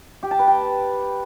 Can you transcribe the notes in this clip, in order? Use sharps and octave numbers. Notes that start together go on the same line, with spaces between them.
G4
A5
B4
G5